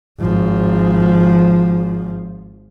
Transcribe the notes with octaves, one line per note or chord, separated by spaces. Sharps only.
G#1 F3